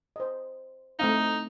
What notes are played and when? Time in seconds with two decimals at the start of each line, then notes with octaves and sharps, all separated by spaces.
0.16 C5 D#5
0.99 A3 C4 D#4 F5